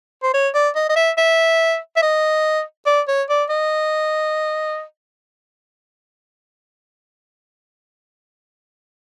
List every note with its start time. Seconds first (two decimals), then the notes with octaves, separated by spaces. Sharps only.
0.23 C5
0.34 C#5
0.54 D5
0.76 D#5
0.89 D#5
0.96 E5
1.18 E5
1.96 E5
2.02 D#5
2.86 D5
3.08 C#5
3.29 D5
3.49 D#5